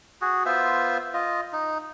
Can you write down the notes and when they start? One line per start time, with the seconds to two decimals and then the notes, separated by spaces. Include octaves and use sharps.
0.21 F#4 G#4
0.46 B3 F4 C5 E5
1.14 F4 D#5
1.53 D#4